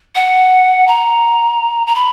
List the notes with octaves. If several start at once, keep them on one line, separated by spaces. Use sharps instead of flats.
F#5
A#5
A#5
B5